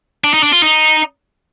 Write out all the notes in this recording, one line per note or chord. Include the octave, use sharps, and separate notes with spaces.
D4
D#4
D4
F4
D#4